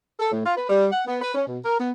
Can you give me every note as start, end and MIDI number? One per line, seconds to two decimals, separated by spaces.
0.20 0.30 69
0.31 0.43 45
0.45 0.55 65
0.57 0.68 71
0.69 0.86 55
0.92 1.01 78
1.07 1.18 59
1.22 1.33 71
1.34 1.43 61
1.47 1.58 47
1.64 1.79 70
1.79 1.90 59